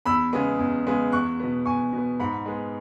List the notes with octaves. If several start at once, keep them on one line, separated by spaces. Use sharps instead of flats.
E2 B5 E6
C#3 G#3 B3
E2
C#3 G#3 B3
E2 C#6 F#6
B2 B3
E2 G#5 C#6
B2 B3
G#2 F#5 B5
G#3 B3